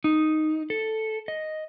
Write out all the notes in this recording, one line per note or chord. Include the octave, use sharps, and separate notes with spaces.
D#4
A4
D#5